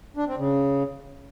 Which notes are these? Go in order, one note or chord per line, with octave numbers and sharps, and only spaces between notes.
D4
C4
C#3